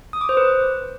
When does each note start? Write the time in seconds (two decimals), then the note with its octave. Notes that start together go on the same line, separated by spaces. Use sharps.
0.13 D#6
0.21 D6
0.29 C5
0.37 B4